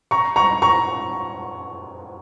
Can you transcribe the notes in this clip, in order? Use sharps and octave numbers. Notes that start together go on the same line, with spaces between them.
A#5 C#6
A#5 C#6
A#5 C#6